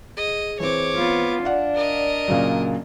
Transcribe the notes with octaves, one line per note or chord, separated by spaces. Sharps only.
G#4 D#5
E3 C4 C#5 D6
B3 F4
D4 D5 F5 F#5
A#4 D#5
A#2 C#3 F#3